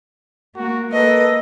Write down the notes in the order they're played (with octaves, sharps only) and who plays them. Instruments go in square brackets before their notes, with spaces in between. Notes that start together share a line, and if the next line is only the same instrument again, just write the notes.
[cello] A#3 [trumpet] F#4
[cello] A#3 [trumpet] A4 [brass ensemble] B4 [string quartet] D#5